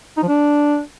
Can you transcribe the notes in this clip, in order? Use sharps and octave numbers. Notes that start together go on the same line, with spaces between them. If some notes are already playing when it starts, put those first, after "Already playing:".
D#4
F3
D4